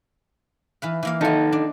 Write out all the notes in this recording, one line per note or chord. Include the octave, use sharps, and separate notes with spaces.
E3 B4 F5
E3 A#3 F5
D#3 D#4 F4 A4
D4